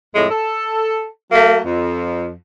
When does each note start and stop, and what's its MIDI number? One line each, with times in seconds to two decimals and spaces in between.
0.14 0.27 41
0.14 0.27 45
0.14 0.27 56
0.31 1.06 69
1.32 1.58 54
1.32 1.58 57
1.32 1.58 58
1.64 2.31 41